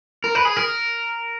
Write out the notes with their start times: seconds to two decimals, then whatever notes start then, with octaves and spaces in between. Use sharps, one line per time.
0.24 A#4
0.35 B4
0.45 G#4
0.56 A#4